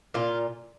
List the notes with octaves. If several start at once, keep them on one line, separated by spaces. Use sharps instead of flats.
A#2 F4